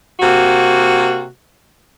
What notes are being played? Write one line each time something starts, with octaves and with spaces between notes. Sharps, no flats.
C3 A#3 F#4